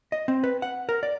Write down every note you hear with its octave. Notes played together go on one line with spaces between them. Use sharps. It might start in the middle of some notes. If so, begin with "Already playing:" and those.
D#5
C4
B4
F#5
A#4
D5